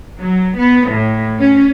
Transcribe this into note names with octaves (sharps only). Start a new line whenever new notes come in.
F#3
B3
A2
C#4